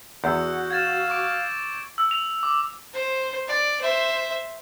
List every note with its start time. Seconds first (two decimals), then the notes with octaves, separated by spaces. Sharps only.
0.24 E2 F#4 G#4 F#5 E6 G6
0.70 F5 G#6 A6 E7
1.10 C#6 D6 D7
1.98 E6
2.11 F7
2.43 D6
2.93 C5
3.48 D5
3.81 C5 E5